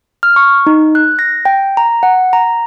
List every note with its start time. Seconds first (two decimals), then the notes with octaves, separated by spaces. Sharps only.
0.23 F6
0.36 C#6
0.67 D#4
0.95 F#6
1.19 A#6
1.45 G5
1.77 A#5
2.03 F#5
2.33 A#5